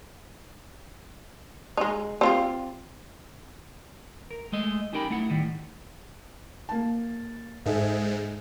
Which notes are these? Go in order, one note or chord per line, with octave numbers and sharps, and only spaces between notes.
G#3 D#4
C4 F4 G4
A#4
G#3 A3 D#5
C#4 D#4 G4 A#4 G5 B5
A3 E4 F#5
A2 D#3 G3
A#3 A5
G#2 G#4 A4 E5